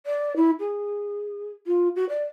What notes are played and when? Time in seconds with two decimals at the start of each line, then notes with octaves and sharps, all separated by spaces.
0.06 D5
0.36 E4
0.60 G#4
1.67 F4
1.96 F#4
2.09 D5